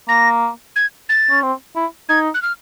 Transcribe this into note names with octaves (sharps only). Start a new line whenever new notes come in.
A#3 A#6
G#6
A6
C#4
C4
E4
D#4 G#6
F#6
F6